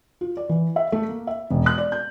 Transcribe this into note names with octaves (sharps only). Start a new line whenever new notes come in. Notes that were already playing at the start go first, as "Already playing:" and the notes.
F4
D5
E3
E5
A3
A#3
E5
E1
F#6
D5
G6